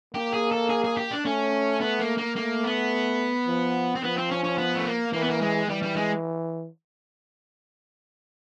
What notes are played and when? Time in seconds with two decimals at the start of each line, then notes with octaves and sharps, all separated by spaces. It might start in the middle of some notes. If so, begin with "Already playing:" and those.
0.14 A#3 G4
0.33 G#4
0.51 A4
0.69 G#4
0.84 G#4
0.97 G4
1.11 D4
1.25 A3 C#4
1.80 B3
2.00 A#3
2.17 A#3
2.36 A3 A#3
2.64 B3
3.47 F3
3.95 C4
4.03 F3 B3
4.17 C4
4.31 C#4
4.44 C#4
4.58 B3
4.75 A3
4.86 A#3
5.13 E3 A#3
5.21 B3
5.29 A#3
5.41 G#3
5.68 E3 G3
5.83 G3
5.96 G#3